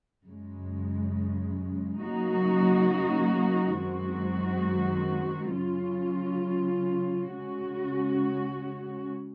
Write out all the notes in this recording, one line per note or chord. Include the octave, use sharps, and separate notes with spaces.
F#2 C#3 G#3
C#3 F#3 A#3 D#4 F#4
F#2 D#3 G#3 C4 F#4
C#3 F#3 C#4 F4
C#3 G#3 C#4 F#4